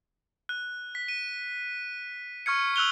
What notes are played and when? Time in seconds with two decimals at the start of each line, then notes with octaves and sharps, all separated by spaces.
0.49 F#6
0.95 B6
1.08 D#7
2.46 C#6 F6 G#6 C#7
2.76 E6 F#6 F7 G7